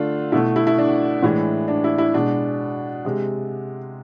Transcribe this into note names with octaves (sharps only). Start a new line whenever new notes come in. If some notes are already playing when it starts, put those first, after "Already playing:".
Already playing: D3 A3 D4 F4
B2 A3 E4
E4
E4
D4
A2 E3 G#3
D4
E4
E4
B2 G#3 D4
C3 G#3